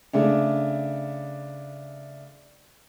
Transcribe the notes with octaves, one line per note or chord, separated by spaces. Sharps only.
C#3 A3 D4